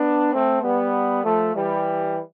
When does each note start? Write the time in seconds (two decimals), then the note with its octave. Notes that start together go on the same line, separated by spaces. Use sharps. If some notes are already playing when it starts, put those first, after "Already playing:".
Already playing: B3 D4
0.33 A3 C4
0.62 G3 B3
1.23 F3 A3
1.54 E3 G3